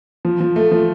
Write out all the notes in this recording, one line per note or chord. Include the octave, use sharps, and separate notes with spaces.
F3
F3
A3
F3